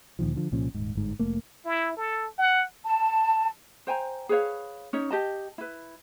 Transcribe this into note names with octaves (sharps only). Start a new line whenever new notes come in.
D2 A#2 D#3 F3
D3 F3
C2 A#2 F3 C#4
D#1 G#2
G1 G#2
F1 A3 A#3
E4
A4
F#5
A5
C5 G5 G#5 A#5
G#4 B4 C#5 F5
C#4 D#4 C#5
G4 D#5 A5
E4 B4